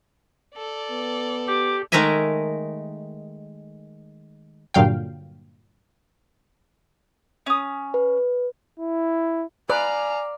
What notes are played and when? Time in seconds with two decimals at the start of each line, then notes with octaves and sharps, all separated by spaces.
0.56 A4 D5
0.91 B3
1.47 G4 D6
1.92 D#3 G#3 A3 A#4 E5 G#5
4.74 G2 A#2 D3 F#3 F5 G5
7.46 C#4 D#6
7.94 B4
8.79 E4
9.70 B4 D5 F5 G#5 A#5